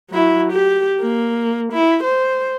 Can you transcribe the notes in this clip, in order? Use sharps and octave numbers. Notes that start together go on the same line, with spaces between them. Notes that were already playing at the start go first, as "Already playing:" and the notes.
F#3 E4
G4
A#3
E4
C5